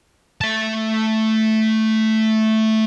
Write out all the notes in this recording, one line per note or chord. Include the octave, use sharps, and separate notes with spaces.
A3 A5